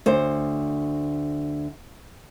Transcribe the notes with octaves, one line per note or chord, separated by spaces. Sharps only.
D2 C5